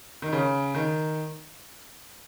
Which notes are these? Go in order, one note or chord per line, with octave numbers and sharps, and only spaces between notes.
D#3
C#3
D#3